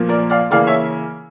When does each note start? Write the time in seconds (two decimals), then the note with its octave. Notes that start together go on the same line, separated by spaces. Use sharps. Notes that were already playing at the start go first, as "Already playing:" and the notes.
Already playing: A#2 F3 A#3
0.09 A#4 D5
0.30 D5 F5
0.51 C#3 E3 A#3 D5 F5
0.67 C#5 E5